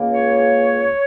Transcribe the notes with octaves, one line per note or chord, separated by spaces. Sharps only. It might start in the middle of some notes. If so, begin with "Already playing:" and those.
Already playing: C#2 C#3 A#3
C#5